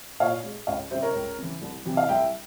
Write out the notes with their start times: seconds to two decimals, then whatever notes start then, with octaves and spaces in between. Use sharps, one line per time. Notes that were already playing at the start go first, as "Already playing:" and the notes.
0.20 A#2 C#5 F5
0.44 G#3
0.67 C#2 C#5 F5
0.91 G3 C5 E5
0.95 C#3
1.02 A#4 C#5
1.14 C#2
1.38 C#3 E3
1.62 C2
1.85 C3 E3 G3
1.97 F5
2.09 C2 E5 G5